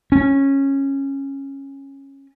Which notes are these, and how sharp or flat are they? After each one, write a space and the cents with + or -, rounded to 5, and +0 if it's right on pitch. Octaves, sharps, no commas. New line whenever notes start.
C#4 -15